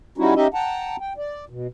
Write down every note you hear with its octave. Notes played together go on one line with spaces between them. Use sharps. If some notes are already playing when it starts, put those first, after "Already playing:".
G3 C#4 D#4 E4 F#4
C#4 D#4 G4 D#5 E5
F#5 G5 A5 A#5
G5
D5
B2